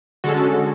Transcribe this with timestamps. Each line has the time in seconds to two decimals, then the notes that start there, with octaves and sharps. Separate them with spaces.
0.24 D3 G#3 C#4 F#4 A4